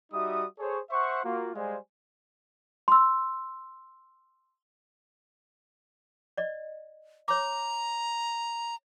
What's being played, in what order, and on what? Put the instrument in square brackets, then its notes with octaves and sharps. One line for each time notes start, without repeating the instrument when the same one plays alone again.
[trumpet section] G3 D#4 F#4 E5 D#6
G#4 A4 C5 C#5
C5 E5 F#5 C#6
A#3 F4 F#4
G3 G#3 C5 D5 F5 G#5
[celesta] C6 E6
[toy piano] D5 D#5
[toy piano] C#5 D6 [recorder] A#5